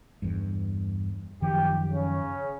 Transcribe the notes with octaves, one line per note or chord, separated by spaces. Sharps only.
E2 G2
F#2 D#3 F3 G4
C#3 C#4